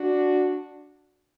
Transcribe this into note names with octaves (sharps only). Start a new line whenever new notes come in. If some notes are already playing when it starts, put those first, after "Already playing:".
Already playing: D4 F#4